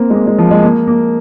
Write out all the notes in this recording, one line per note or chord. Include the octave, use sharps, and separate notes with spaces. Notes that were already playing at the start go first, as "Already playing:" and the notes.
Already playing: A#3 C4
G#3
A#3
G#3
F3
G#3
A#3
A#3